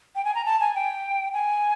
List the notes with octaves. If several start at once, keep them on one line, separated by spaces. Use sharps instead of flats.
G5
G#5
A#5
A5
G#5
G5
G#5